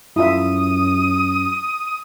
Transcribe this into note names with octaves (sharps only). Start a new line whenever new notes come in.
F#2 E4 F4 E5 D#6